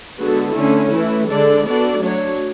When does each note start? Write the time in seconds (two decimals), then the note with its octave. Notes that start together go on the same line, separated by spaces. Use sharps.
0.18 D3 G#3 B3 F#4 A4
0.54 D3 A3 C#4 E4
0.91 E3 A3 E4
1.28 D3 G#3 D4 A4 D5
1.65 B3 D4 F#4 A4 D5
2.00 F#3 A3 D4 F#4 C#5